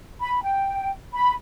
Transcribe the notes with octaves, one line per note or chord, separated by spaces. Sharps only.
B5
G5
B5